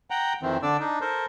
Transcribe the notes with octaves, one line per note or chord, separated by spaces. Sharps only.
F#5 G5 A#5
F2 D#3 E3 C4
D3 D4 D5 E6
D4 D#4
A4 A#4 C5